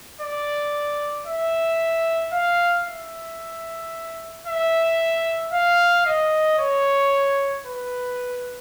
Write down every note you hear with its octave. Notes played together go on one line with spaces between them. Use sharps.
D5
E5
F5
E5
E5
F5
D#5
C#5
B4